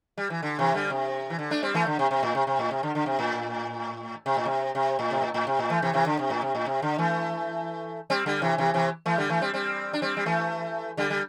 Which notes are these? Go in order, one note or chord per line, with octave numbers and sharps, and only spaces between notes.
G3
E3
D3
C3 E3
D3 G3
C3
E3
D3
A3 D4
G3 C4
E3 A3
D3
C3
C3
A2
C3
C3
A2
C3
D3
D3
C3
A2
C3
A2
C3
C3
A2
C3
A2
A2
C3
A2
E3 A3
C3 E3
C3 E3
D3
C3
A2
C3
A2
C3
D3
E3 A3
G3 C4
D3 G3
C3 E3
C3 E3
C3 E3
E3 A3
D3 G3
E3 A3
G3 C4
G3 C4
D4
G3 C4
G3
E3 A3
D3 G3
G3